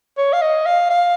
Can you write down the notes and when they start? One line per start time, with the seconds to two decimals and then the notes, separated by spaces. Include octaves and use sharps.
0.18 C#5
0.33 F5
0.42 D#5
0.66 F5
0.90 F5